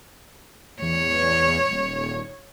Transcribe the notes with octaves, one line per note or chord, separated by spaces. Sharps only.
E2 C#5
D#1